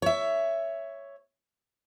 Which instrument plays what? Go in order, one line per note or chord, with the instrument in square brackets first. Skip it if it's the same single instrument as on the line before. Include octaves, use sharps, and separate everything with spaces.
[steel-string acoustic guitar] C#5 E5